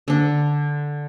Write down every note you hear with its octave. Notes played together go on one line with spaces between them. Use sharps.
D3 D4